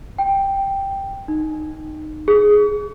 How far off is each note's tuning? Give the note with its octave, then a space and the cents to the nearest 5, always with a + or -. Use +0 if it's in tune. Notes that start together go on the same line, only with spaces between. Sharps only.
G5 +0
D#4 -15
G#4 +5